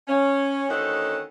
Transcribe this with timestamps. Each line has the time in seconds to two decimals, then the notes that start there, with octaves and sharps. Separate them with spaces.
0.08 C#4
0.69 D2 D#3 C#4 D#4 A4 F#5